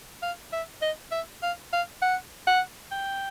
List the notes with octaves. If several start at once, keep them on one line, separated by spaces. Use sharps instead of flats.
F5
E5
D#5
E5
F5
F5
F#5
F#5
G5